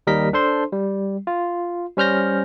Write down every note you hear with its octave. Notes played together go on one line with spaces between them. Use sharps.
D#2 G3 A#4 D#5 B6
D4 A4 C5 C6
G3
F4
G3 C#4 C5 F6 G6 A#6